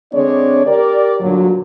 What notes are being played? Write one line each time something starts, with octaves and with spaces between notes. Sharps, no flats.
D3 G#3 C4 D4 C#5 D5
G4 A#4 D5
G2 A#2 D3 F#3